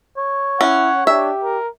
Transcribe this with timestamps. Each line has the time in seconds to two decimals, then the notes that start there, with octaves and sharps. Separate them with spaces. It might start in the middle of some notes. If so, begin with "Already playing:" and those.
0.17 C#5
0.61 C#4 E4 F#5
1.07 D4 G4 E5
1.43 A#4